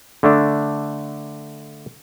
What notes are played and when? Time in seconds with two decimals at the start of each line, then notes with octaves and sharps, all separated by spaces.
0.23 D3 A3 D4